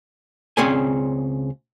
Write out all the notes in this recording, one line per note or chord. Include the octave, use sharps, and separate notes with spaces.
C#2 C4 C#4 G#4 D5 G#5